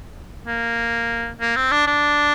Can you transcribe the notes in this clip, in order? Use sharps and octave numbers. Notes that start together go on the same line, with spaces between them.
A#3
A#3
C4
D4
D4